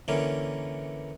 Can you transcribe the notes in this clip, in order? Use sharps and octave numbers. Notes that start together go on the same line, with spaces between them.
D3 E3 A#3 C#4